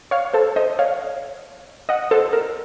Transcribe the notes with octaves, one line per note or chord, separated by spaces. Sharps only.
C#5 F5
A4 C5
C5 D#5
C#5 F5
D#5 F#5
A4 C5
A#4